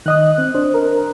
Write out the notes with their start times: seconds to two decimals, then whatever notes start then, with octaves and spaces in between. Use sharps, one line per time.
0.06 D#3 D#5 D#6 F#6
0.38 C4
0.55 D4 C5
0.74 A#4